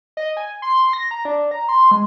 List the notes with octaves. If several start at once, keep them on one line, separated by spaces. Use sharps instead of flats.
D#5
G#5
C6
A#6
A#5
D4
A#5
C6
G#3